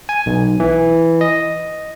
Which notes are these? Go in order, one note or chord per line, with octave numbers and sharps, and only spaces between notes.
G#5
B1
E3
D#5